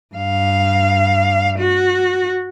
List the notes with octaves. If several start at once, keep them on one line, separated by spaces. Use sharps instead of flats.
G2 F5
F#4